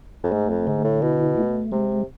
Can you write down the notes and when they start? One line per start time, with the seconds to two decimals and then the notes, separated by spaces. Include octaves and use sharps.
0.24 F2
0.32 G#2 A3
0.50 F2
0.67 G#2 D3
0.84 A2
1.02 B2 E4
1.37 A3
1.72 C3 G#3